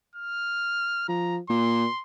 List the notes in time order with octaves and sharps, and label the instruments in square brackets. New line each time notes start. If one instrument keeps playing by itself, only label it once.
[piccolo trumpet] F6
[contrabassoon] F3 [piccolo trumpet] A#5
[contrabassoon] A#2 [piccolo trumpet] C6